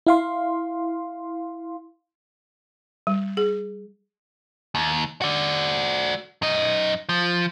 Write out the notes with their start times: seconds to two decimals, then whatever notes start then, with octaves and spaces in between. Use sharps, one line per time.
0.07 E4 F5 C6
3.07 G3
3.37 G#4
4.75 D#2
5.21 F#4 D5
6.42 F#2 D#5
7.09 F3